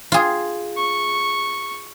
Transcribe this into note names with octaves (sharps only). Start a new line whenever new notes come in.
F4 G#4
C#6